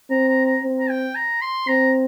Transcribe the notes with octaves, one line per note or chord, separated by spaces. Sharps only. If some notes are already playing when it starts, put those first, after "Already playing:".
C4 A#5
A#5
A#5
C4
A#5
G5
A#5
C6
C4 A#5